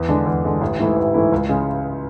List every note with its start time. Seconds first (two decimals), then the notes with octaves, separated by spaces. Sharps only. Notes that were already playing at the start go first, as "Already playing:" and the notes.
Already playing: E2
0.09 D3 G#3 D4
0.26 E2
0.44 D3 G#3 D4
0.61 A1
0.79 G#2 E3 A3 E4
0.96 A1
1.14 G#2 E3 A3 E4
1.32 C#2
1.49 C#3 G#3